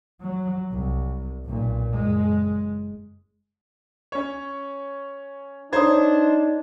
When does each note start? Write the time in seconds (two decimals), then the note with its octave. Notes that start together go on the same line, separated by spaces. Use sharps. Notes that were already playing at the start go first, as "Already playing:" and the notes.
0.21 F#3
0.71 C2
1.46 B1 A#2
1.92 F#1 G#3
4.12 C#4 C#5
5.73 D4 D#4 C5 C#5 A#5 D#6 G#6